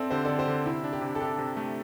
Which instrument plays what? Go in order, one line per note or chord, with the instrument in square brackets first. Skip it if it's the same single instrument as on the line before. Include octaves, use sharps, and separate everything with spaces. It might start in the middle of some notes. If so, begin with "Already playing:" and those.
Already playing: [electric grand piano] C4 [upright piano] A4 C5 D5 E5
[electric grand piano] D3 [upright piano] G4 C5
[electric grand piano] D3 [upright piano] A4 D5
[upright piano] G4 C5
[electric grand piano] D3
[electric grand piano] C3 [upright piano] E4
[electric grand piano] D4
[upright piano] G4
[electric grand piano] C3
[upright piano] A4
[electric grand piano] D4 [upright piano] G4
[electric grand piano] C3
A3